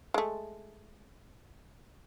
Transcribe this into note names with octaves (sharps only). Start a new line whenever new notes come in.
G#3 A3